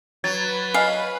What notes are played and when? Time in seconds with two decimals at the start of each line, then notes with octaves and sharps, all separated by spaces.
0.24 F#3 B4 G#6 A6
0.74 D#5 F5 G#5